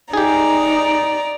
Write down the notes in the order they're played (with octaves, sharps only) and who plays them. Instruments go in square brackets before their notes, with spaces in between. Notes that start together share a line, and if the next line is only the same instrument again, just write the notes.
[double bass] D#4 [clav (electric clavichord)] G4 G#4 [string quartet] D5 A#5